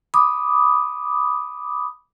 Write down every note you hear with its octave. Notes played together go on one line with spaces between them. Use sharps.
B5 D6 D#6